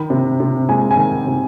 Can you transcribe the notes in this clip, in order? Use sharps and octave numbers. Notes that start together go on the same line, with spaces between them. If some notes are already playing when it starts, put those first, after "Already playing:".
Already playing: D#3 B5
C3
C3
G#3 G#5
G#5
D#3
C3